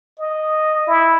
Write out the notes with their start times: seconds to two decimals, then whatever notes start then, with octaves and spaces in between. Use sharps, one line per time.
0.19 D#5
0.87 E4